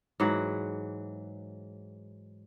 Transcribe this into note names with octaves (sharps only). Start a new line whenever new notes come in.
G#2 E3 F#3 F#5